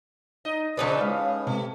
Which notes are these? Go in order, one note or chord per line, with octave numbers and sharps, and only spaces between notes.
D#4 D#5
C#3 F3 G#3 C#4 D#4 B4 C5 D5
A2 G#3 F5
C3 A3